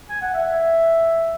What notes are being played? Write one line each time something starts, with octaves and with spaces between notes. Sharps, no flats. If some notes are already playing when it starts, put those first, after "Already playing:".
G#5
F#5
E5